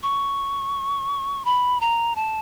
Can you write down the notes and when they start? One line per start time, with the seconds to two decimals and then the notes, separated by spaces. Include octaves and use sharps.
0.03 C#6
1.45 B5
1.81 A#5
2.16 A5